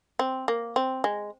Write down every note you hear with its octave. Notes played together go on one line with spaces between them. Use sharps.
C4
A#3
C4
G#3